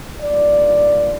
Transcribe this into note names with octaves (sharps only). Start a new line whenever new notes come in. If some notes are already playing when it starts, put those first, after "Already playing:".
G2 D#3 A#3 F4 D5